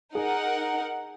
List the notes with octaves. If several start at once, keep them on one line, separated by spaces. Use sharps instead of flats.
D#4 G#4 A#4 F#5